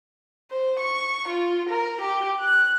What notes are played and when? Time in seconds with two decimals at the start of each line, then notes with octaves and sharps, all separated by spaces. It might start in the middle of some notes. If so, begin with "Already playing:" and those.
0.51 C5
0.80 C#6
1.28 F4
1.69 A#4
2.01 G4
2.40 F#6